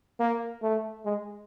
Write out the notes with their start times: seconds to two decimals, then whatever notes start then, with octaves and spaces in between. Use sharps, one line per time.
0.20 A#3
0.62 A3
1.05 G#3